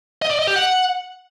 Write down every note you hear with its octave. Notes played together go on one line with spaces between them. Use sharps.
D#5
D5
D#5
G4
F#5